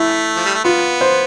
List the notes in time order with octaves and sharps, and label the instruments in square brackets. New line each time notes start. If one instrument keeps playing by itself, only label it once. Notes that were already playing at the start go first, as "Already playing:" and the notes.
Already playing: [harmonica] A3 [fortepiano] E4
[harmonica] F3
G3
A3
[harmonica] B3 [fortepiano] F4
[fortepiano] C5